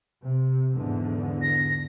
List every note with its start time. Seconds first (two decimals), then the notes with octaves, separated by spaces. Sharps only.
0.23 C3
0.74 E2 G#2 D3
1.42 A#6